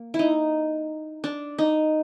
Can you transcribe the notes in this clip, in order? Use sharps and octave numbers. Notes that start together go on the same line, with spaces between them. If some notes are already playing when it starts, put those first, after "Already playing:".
Already playing: A#3
E4
D#4
D4
D#4